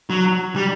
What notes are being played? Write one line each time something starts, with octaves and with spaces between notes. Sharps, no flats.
F#3
G3